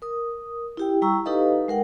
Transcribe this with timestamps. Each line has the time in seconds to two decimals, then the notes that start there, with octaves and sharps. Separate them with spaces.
0.02 A#4 D#6
0.77 E4 G4 G5
1.02 G3 E4 G5 A#5 C#6 E6
1.25 D#4 G4 A4 B4 D#5 F5
1.68 G#3 A#4 F#5 G5